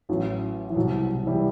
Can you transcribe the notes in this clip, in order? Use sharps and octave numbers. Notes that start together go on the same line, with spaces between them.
A1 A2 E3 F#3
E3
C2 B2 F#3
E3 G3